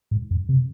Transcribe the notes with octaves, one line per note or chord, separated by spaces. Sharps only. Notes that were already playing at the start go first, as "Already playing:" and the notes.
G#2
F#2
C3